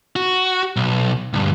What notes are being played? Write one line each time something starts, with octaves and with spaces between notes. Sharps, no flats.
F#4
B1
D2 G2